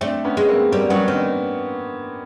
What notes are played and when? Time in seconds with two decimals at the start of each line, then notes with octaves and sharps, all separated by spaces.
0.01 A3 C4 D4
0.25 B3 C#4
0.37 G#3
0.49 A#3 C4
0.72 G3 A#3 C4
0.90 F#3 B3 C#4
1.07 D#3 C4 D4